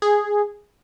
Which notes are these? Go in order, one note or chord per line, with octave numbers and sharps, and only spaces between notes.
G#4